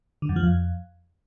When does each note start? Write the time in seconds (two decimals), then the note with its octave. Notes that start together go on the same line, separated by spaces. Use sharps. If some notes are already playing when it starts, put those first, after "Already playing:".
0.22 D3
0.29 F#2
0.36 F3
0.43 F2